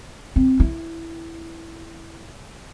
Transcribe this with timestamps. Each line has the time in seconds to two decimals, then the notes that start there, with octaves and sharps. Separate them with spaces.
0.36 C4
0.60 E4